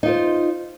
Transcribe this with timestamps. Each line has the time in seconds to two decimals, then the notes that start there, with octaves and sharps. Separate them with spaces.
0.03 D#4
0.06 F4
0.08 C5